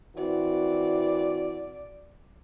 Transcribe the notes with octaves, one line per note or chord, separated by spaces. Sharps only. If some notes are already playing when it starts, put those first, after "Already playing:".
E3 C4 F#4 D5